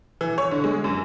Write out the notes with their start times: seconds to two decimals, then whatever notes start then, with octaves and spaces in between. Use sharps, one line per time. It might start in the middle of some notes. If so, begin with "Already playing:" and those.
0.21 E3
0.38 C#5
0.51 D3
0.64 G#3
0.84 F#2